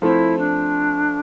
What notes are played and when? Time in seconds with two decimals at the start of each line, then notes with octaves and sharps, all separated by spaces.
0.02 F3 A3 C4 E4
0.38 D4